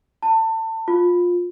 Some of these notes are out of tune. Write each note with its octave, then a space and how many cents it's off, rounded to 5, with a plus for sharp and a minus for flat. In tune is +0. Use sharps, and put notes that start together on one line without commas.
A5 +30
F4 +20